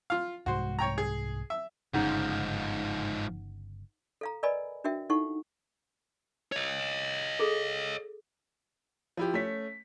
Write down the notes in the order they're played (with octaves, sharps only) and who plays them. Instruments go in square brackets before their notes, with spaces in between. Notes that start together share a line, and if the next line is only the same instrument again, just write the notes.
[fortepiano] F4 F5
[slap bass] C2 G#2 G#3 [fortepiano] F#4 C5
[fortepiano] C#5 G5 A#5
G#4
E5
[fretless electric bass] G1 C#3 [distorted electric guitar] G#2 F3 [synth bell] D#4 F#5
[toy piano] A4 F5 A#5
A#4 B4 D5 D#5 G#5 B5
D4 F#4 A#4 E5 G5
D#4 E4 A4 F#5 C#6
[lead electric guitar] C#5 D#5
[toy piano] G#4 A4
[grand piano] F3 E4 G4
A3 C#4 B6